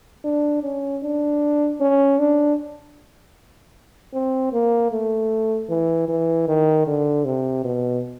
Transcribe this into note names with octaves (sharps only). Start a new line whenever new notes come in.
D4
C#4
D4
C#4
D4
C4
A#3
A3
E3
E3
D#3
D3
C3
B2